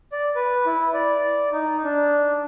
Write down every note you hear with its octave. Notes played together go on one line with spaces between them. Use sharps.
D5
B4
E4
D5
D#4
D4